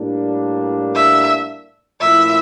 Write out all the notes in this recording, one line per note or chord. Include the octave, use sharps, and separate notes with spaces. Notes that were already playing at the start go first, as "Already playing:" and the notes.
Already playing: A2 G3 A#3 D4
E5
A#2 F3 A3 C#4 E4 E5